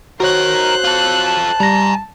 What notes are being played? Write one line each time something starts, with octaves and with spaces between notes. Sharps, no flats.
D#4 F#4 A#4 C5 C#5 F#6
F4 A4
A5
G3 G#5 A#5 A#6